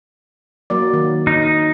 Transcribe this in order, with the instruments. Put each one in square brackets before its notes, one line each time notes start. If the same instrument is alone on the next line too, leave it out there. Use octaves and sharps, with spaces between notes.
[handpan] F#3 A#3 D5
D#3
[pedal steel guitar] D#4